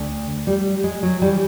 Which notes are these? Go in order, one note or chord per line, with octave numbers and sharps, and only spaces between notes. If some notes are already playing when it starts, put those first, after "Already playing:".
Already playing: D2
G3
G#3
F#3
E3 G3